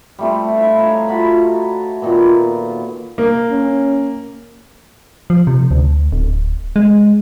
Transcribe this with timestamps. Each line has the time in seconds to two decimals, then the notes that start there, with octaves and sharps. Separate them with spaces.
0.19 G3 A3 C4
0.55 E4 E5 F5
0.79 D#4 C#5
1.08 F4 F#4 B5
2.02 A#2 D#3 B3
3.18 A#3
3.50 C#4
5.30 F3
5.47 C3
5.71 D2
6.12 D1
6.76 G#3